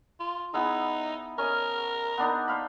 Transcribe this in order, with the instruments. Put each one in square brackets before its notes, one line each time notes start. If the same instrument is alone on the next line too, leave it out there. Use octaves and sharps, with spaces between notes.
[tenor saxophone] F4
[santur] B3 E4 G#4 [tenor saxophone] D#4
[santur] C#4 D#5 [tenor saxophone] A#4
[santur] B3 D4 D#4
C5 F5 B5